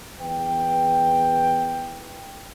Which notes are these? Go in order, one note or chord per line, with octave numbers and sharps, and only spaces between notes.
E2 B4 G5